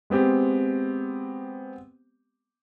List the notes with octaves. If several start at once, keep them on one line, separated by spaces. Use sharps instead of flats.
G#3 B3 C4 G4